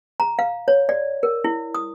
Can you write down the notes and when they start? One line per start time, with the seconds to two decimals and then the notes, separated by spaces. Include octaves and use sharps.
0.20 A#5
0.39 F5
0.68 C#5
0.89 D5
1.23 A#4
1.44 E4
1.75 D#6